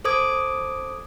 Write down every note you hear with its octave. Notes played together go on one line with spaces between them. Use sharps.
A4 C5 D6 D#6 G#6 D7